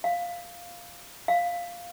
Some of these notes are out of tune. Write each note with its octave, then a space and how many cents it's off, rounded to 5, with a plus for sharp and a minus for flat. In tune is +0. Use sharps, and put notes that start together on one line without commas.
F5 +0
F5 +0